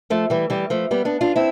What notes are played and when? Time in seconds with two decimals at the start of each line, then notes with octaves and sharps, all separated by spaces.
0.10 F3 A3
0.30 E3 G3
0.50 E3 G3
0.70 F3 A3
0.91 G3 B3
1.05 B3 D4
1.21 D4 F4
1.36 C4 E4